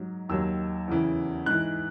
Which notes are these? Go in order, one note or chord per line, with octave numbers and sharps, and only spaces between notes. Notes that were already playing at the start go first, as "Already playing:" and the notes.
Already playing: G#2 F#3
D#2 D#3 F#3 E6
E2 C#3 E3
G#2 E3 F#6